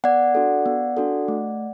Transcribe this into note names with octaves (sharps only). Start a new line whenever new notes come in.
B3 D5 F#5
D4 F#4 A4
B3
D4 F#4 A4
A3